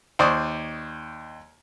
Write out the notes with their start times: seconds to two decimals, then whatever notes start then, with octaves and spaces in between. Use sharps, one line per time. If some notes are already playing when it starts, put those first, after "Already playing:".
0.19 D#2 C5 D5 C#6 D#6